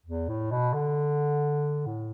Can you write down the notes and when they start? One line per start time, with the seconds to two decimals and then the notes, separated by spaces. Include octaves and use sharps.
0.06 E2
0.29 A2
0.51 B2
0.74 D3
1.86 A2